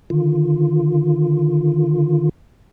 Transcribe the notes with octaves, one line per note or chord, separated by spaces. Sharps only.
D3 D#3 F4